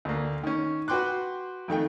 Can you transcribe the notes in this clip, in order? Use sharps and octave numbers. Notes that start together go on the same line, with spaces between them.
D2 A#3
D#3 C#4
F#4 B4 G5 C6 D6 F#6
F2 D#3 A3 G5